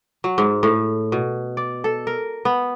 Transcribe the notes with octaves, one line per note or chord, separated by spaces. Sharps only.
F#3
G#2
A2
B2
D5
A4
A#4
B3